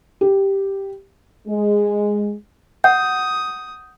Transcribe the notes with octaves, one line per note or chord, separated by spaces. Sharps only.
G4
G#3
F#5 D#6 G6